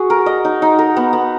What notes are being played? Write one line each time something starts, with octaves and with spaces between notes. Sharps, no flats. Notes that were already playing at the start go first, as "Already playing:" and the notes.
Already playing: F#4 G#4
A#4
D#5
D#4
D#4
A#4
B3
B3